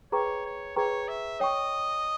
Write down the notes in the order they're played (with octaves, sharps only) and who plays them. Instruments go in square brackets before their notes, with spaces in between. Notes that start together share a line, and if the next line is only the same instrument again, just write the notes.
[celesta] G#4 B4 G5 A#5 C#6 [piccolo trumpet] C#5
[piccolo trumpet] C#5
[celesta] G#4 B4 G5 A#5 C#6 [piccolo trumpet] C#5
[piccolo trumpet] E5
[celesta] C#5 G5 C#6 [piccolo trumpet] D#5